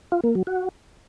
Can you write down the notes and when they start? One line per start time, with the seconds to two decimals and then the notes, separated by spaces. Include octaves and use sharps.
0.12 F4
0.24 A#3
0.35 F#3
0.47 F#4